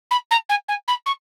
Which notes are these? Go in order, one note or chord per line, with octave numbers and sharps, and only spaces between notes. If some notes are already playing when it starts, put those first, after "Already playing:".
B5
A#5
G#5
G#5
B5
C#6